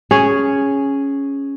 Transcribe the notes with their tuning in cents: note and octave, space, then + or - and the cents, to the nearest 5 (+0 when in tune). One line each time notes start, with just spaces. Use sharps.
C#4 +0 G#4 +0